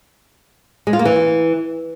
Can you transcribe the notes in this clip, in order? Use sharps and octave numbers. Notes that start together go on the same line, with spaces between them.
G#3
F4
A#3
E3